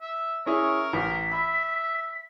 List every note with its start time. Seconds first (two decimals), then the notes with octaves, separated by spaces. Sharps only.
0.01 E5
0.46 C#4 E4 G#4 A#4 C#6
0.93 A1 B6
1.32 E5 B5